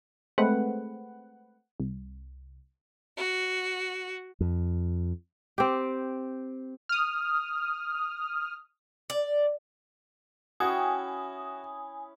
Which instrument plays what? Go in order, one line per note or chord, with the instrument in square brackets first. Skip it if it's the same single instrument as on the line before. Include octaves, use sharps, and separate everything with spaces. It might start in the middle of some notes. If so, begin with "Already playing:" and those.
[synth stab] G#3 A3 C4 B4 F#5
C2
[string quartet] F#4
[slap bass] F2
[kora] C4 G4
[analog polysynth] D#6 F6
[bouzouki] D5
[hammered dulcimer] C#4 E4 G5 [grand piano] F#4 [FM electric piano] G#5 [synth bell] D#6